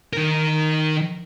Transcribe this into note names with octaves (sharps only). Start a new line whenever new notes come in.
D#3 A#4